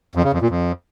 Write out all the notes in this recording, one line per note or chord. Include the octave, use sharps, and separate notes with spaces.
F2
C#3
F2
A#2
F2